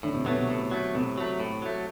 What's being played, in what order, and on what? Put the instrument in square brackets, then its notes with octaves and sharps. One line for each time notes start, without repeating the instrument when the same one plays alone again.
[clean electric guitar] A2 [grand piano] D3
[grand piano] C3
[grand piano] B2 [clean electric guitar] F#3 A3
[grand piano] C3
[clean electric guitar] A2
F#3 A3
[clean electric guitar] A2 [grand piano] C3
[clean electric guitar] F#3 A3
A2
F#3 A3